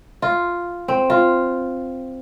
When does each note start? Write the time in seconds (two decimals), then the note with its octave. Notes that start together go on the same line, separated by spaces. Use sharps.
0.22 F4
0.88 C4
1.10 F4